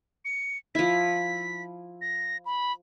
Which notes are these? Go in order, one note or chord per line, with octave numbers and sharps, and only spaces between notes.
C#7
F3 E4 B6
A#6
B5